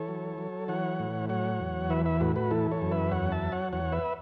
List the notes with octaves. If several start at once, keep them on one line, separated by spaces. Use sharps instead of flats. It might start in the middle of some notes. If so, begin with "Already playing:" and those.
Already playing: E3 A4 C#5
F#3
F#3
E3 C#5 F#5
A2
F#3 C#5 F#5
E2
E3 B4 E5
B4 E5
A2 F#4 B4
F#4 B4
E3 E4 A4
A4 C#5
F#2
B4 E5
E2 C#5 F#5
E5 A5
F#3
C#5 F#5
E2 C#5 F#5
B4 E5